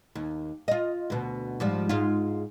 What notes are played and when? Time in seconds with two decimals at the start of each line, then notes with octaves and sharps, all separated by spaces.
0.15 D#2
0.68 F4 D#5
1.10 D2 B2
1.60 G#2 F3 G3
1.89 G#2 F4